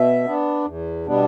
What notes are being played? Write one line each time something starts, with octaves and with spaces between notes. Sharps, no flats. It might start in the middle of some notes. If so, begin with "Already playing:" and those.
Already playing: B2 E5
B3 D4
E2
B2 G3 B3 D4